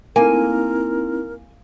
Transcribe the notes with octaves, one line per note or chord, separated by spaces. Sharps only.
A#3 C4 D#4 E4 A#4 G#5